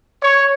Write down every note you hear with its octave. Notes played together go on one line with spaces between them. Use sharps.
C#5